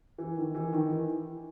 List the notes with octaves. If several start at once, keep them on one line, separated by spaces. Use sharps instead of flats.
E3
D#3
E3
D#3
E3